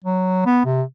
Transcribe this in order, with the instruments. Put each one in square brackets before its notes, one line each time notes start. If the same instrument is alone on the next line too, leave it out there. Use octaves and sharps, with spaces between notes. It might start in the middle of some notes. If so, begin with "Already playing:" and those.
[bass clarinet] F#3
B3
C3